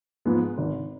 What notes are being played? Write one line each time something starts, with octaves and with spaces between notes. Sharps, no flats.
G#2 F3 G#3 B3
G#1